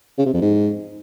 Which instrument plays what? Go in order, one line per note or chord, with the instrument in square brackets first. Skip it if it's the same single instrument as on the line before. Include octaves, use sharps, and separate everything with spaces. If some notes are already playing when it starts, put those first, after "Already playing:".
[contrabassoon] C#3
C3
F2
G#2